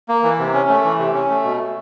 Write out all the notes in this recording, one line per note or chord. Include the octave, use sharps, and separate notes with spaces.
A#3
E3
C3
C#4
A3
E3
C3
C#4
A3
B2